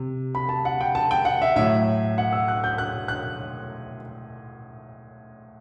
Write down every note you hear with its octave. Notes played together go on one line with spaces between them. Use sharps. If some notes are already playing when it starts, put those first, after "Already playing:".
Already playing: C3
B5
A5
F#5
G5
A5
G5
F#5
E5
A2 F#3 E5
F#5
E6
F#6
G6
F#6
F#6